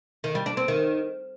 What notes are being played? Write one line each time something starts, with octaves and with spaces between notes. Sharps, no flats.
D#3
G3
D4
C4
D#3